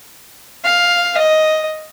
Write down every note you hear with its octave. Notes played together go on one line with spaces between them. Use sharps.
F5
D#5